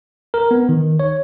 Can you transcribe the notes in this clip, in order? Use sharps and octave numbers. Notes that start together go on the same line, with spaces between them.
A#4
B3
D#3
C#5